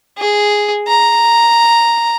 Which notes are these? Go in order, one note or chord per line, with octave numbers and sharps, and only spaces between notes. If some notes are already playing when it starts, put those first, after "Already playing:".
G#4
A#5